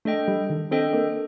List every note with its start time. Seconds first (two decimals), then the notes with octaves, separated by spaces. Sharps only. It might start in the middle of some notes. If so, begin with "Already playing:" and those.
0.05 A3 D4 A4 D#5 G5
0.28 G3
0.50 D#3
0.71 C4 D4 A4 D#5 G5
0.93 A#3